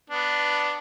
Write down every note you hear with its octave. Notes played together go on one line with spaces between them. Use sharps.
B3 D4